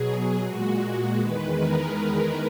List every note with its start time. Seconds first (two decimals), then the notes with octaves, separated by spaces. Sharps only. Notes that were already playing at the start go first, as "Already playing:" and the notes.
Already playing: B2 F#3 G#4
0.44 A#2 G#3 F#4
1.19 E2 D#3 G#3 B4
1.57 A#4